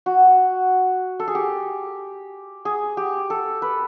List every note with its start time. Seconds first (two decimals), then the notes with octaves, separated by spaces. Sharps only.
0.06 F#4
1.20 A4
1.28 G#4
1.35 G4
2.65 G#4
2.97 G4
3.30 A4
3.62 B4